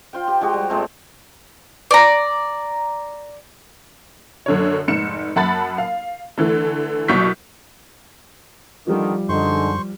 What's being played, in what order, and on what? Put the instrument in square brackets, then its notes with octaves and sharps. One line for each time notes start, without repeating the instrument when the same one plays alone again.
[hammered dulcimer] F4 C5 G5
G4
F3 G#3 F#4 G4
G3
A#2 G#3 A3 C4
[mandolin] D5 A#5
[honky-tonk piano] F#2 D3 C#5
F1 G#2 C#7 E7
F#2 F#5 A5 B5 A6
F5
D3 E3 A3
C2 B2 F#3 C#6 G6 B6
[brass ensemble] D3 D#3 [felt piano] F3 G3
[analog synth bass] F#2 [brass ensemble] D3 G#3 D#4 [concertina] C5 C6 C#6